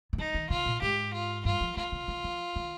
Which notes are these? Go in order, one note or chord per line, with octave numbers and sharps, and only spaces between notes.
D#3
F3 D#4
D#3
C#3 F4
A#2
G#2 G4
F4
G2 F4
F3
D#3 F4
C#3
D#3
F3
D#3